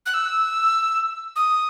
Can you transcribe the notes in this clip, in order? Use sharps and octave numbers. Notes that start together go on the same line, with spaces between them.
F#6
E6
D#6